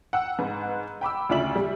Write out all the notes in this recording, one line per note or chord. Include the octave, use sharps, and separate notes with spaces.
F#5 G5 E6
G#2 B4
G5 B5 D6 E6
D2 C#3 F4 D5 E5 F#7
G3